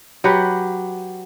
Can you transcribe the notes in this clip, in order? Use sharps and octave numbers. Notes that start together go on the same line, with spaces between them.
F#3 G4 B4 F#5